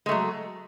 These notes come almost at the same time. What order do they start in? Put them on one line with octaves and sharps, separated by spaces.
G#3 A3 F#3